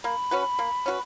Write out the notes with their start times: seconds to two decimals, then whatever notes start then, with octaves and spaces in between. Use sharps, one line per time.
0.04 A#3 B5
0.31 C#4 F#4 B4
0.59 A#3
0.86 C#4 F#4 B4